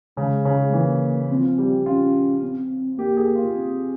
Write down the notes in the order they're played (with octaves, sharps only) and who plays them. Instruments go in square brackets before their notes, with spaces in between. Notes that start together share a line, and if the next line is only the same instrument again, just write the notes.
[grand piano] C#3 [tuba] G#3
[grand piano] C#3
[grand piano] E3 [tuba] A#3
[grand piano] F3 [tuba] C4
[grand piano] G3
[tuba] C#4 [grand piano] F4
[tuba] C4
[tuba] A#3 [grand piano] G4
[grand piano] G#4
F4
[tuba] C4